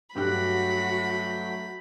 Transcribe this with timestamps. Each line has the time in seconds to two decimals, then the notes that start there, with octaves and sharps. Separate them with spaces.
0.15 G2 F#3 A3 F#4 G4 G5 B5 F#6